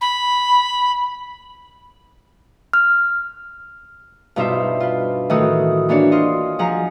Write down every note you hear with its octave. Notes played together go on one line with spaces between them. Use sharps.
B5
F6
G2 B2 D#4 F4 C5 E5
F4 B4
A2 D#3 E3 A3 F#4 D#6
E3 A#3 D4 F#4 C#5 D5
F4 D#5 C6
F3 G#4 F#5 A#5